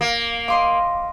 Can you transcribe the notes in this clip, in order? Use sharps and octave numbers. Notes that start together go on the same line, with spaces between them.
A#3
D#5 F5 C6 D6